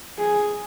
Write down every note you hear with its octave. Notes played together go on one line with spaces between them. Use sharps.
G#4